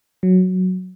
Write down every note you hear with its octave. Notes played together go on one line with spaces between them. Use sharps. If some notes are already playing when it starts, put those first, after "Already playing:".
F#3